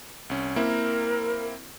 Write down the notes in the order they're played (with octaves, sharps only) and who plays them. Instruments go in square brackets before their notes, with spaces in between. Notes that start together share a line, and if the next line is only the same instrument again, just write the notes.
[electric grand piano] C2 C#4
[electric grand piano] A#3 C4 E4 [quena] A#4